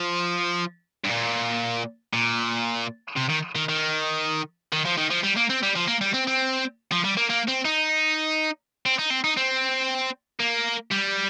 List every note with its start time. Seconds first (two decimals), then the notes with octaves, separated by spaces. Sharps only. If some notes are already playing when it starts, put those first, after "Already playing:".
Already playing: F3
1.05 G2
1.10 A#2
2.13 A#2
3.17 C3
3.30 D#3
3.55 D#3
3.69 D#3
4.72 D#3
4.85 F3
4.97 D#3
5.10 F3
5.23 G3
5.36 A#3
5.50 C4
5.63 G3
5.76 F3
5.88 A#3
6.01 G3
6.14 C4
6.27 C4
6.91 F3
7.04 G3
7.17 A#3
7.30 A#3
7.48 C4
7.65 D#4
8.86 C4
8.99 D#4
9.11 C4
9.24 D#4
9.37 C4
10.40 A#3
10.91 G3